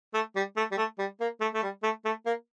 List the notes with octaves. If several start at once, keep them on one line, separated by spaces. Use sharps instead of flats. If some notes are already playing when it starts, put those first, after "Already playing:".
A3
G3
A3
G3
A3
G3
A#3
A3
A3
G3
A3
A3
A#3